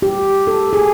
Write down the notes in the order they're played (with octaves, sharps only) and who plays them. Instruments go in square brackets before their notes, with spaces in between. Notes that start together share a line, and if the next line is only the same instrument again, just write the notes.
[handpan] G4
A4
G#4